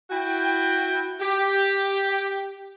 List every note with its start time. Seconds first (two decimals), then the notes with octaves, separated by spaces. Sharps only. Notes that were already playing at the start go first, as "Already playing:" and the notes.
0.10 E4 F#4 G5
1.20 G4